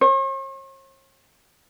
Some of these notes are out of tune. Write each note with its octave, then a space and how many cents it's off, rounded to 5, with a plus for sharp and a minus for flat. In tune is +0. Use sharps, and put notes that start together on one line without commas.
C#5 -45